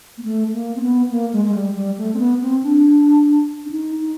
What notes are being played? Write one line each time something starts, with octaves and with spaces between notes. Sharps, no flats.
A#3
A3
A#3
C4
B3
A#3
G#3
G#3
G3
G3
A3
C4
B3
C4
D4
D4
D#4
D#4